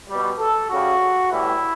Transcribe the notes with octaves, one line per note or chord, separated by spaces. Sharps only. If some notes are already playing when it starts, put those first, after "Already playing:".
B2 G3
A4
C#3 G3 F#4
A2 E3 G3 E4